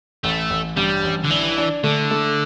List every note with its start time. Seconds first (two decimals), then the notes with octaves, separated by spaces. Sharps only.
0.24 A1 A3
0.50 A1
0.77 G2 G3
1.04 A1
1.24 D3
1.30 E3 D4
1.58 D4
1.84 D3 A3
2.11 A3